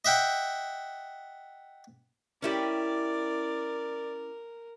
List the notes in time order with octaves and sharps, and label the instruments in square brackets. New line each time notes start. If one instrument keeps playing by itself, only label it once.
[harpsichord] D#5 E5 F#5 G5
[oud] C#4 E4 G4 [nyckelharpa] A#4 [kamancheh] D5